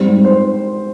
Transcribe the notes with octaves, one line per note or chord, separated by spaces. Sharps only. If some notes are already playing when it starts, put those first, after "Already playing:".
Already playing: G#2 G3 C4 C5
C5